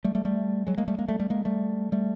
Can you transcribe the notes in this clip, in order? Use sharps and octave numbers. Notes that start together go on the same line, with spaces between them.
G3 A3
G3 A3
G3 A3
F#3 G#3
G#3 A#3
G3 A3
G#3 A#3
G3 A3
G3 A3
G#3 A#3
G3 A3
G3 A3